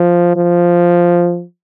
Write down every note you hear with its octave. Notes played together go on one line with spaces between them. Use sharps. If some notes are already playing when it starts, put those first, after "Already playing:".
Already playing: F3
F3